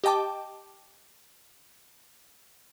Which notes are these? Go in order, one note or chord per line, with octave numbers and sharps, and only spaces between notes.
G4 D#5 G5 A5 D6